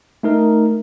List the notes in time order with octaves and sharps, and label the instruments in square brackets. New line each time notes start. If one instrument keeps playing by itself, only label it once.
[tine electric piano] A3 D#4 A#4